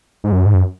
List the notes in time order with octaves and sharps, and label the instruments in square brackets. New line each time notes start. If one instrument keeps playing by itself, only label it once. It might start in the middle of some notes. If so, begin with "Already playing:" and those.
[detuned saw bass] G#2
F#2
G#2
F#2